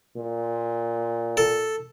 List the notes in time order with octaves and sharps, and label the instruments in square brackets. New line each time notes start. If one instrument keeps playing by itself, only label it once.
[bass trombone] A#2
[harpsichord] A4